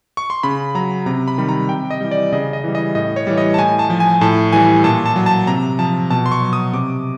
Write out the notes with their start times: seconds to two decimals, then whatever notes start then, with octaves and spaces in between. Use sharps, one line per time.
0.17 C#6
0.30 C6
0.43 C#3 B5
0.75 F#3 A#5
1.06 C3 A#5
1.28 B5
1.38 D#3 G3 B5
1.49 A#5
1.69 C3 G5
1.90 D#5
2.01 E3 G3
2.11 D5
2.32 C#3 D#5
2.53 D#5
2.64 E3 G3
2.75 D#5
2.95 A2 D#5
3.16 C#5
3.27 E3 G3
3.38 D#5
3.54 A5
3.58 A2 G#5
3.79 A5
3.90 F3
4.00 G#5
4.21 A2 A5
4.53 E3 G3 G#5
4.84 A#2 A5
5.06 A5
5.16 F#3
5.26 A5
5.47 C3 A#5
5.79 F3 A5
6.10 B2 A5
6.26 C6
6.32 C#6
6.42 F#3
6.53 D#6
6.73 C3 D6